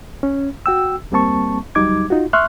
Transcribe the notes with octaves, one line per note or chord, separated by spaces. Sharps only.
C#4
F#4 G5 E6
D2 G3 A#3 C4 A5 C#6
D2 F#3 G3 D#4 D6 G#6
D#4 F4 F#4
E5 C6 C#6 F6 F#6